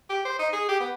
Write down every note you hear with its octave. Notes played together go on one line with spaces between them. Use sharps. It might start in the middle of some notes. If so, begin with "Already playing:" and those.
G4
C5
D#4
G#4
G4
B3